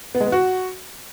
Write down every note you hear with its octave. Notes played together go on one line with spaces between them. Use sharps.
B3
G#3
B3
F#4